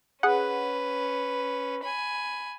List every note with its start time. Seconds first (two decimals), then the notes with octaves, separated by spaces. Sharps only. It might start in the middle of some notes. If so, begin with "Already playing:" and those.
0.23 C#4 G#4 B4 F#5
1.83 G#5 B5